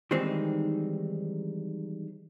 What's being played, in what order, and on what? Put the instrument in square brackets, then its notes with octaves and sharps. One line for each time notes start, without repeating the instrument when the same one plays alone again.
[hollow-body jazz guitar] D#3 E3 G3 G#3 C4 D#4